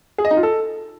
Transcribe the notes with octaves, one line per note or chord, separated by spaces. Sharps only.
G#4
D#5
D#4
F4
A4